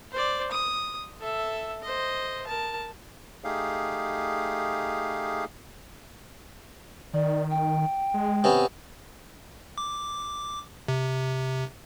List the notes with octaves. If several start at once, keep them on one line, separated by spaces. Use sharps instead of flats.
C5 D5
D#6
A4 E5
C5 D#5
A#4 A5
A3 D#4 G4 G#4 F5
D#3 D5
G5
G#3
C3 B3 C#4
D6
C3